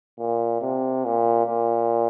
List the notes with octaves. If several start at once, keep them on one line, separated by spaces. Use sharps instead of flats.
A#2
C3
A#2
A#2